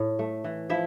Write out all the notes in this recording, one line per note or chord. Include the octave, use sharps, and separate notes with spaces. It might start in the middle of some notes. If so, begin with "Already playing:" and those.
Already playing: A2
A3
E3
F3 E4 E5